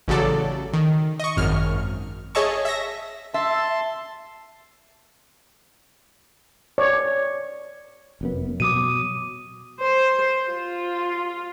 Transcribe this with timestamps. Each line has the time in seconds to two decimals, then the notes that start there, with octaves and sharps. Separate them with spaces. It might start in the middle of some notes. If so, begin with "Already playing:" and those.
0.08 A1 C#3 F#3 A4 D5
0.73 D#3
1.20 D#5 C#6
1.37 G#1 F#2 F6
2.35 G#4 C#5 D#5 E5 A5 C#6
2.65 E5 A#6
3.34 E5 A5 C6
6.78 C#5 D5
8.21 F1 F#2 B3
8.60 B2 F#3 D6 D#6 D#7
9.80 C5
10.50 F4